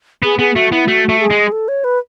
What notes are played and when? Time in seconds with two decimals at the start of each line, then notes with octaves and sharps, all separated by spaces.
0.23 B3 G#4
0.39 B3 G#4
0.55 A3 F#4
0.71 B3 E4
0.87 A3 F#4
1.09 A3
1.20 G#4
1.31 G#3
1.52 A4
1.68 C#5
1.84 B4